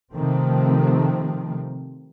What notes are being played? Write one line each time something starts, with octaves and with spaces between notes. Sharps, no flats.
C3 D#3 F3 A3 C4